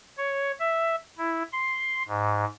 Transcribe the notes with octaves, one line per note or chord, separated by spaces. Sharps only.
C#5
E5
E4
C6
G#2